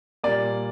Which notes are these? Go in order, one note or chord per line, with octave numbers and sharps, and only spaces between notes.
A#2 G3 A#3 D5